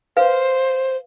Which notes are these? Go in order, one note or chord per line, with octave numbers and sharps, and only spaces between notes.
B4 C5 F5